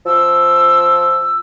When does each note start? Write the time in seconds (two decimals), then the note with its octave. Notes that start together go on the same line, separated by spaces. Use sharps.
0.06 F3 E6